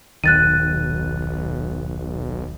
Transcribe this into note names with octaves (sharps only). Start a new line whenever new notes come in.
D#1 B1 D#3 F#6 A6 D#7